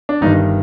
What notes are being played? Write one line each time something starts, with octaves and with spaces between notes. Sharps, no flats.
D4
G1 G2 D#3 D#4